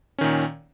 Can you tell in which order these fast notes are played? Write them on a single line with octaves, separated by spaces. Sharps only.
C#4 D#3 A#2